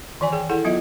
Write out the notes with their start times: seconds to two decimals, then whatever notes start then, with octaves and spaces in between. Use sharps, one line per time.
0.21 D#3 E3 D5 G#5
0.32 G#4 G5
0.49 E4 G#4 A4 F#5
0.65 F#3 B3 F4 D#5 E5